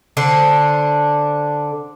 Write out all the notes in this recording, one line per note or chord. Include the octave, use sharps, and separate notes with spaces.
D3 D4 C5